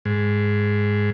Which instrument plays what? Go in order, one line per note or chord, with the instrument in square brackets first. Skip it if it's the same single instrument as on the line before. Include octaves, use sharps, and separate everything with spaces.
[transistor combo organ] G#2